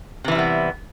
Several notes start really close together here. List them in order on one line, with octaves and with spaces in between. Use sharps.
C3 E3 E4 G3 B3